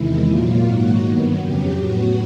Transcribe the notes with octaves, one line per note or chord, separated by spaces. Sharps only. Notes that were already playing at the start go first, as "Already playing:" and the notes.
Already playing: E2 C3 D#3 G#3 E4
A#2 F#3 A#3 F4
G#2 D#3 F#3 A#3 F#4
G2 D#3 F#3 B3
F2 C#3 F#3 G4
A2 F#3 B3 F#4